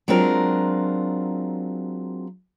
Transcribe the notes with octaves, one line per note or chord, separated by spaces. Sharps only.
F#3 G#3 C4 D4 F4 A#4